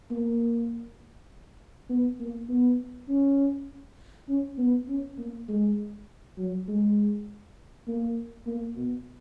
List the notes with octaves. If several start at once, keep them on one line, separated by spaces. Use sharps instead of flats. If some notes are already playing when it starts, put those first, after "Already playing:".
A#3
B3
A#3
B3
C#4
C#4
B3
C#4
A#3
G#3
F#3
G#3
A#3
A#3
B2